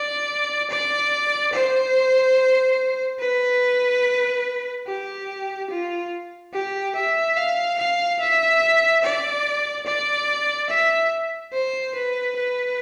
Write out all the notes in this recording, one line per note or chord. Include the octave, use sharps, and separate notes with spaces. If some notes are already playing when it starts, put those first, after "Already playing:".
Already playing: D5
D5
C5
B4
G4
F4
G4
E5
F5
F5
E5
D5
D5
E5
C5
B4
B4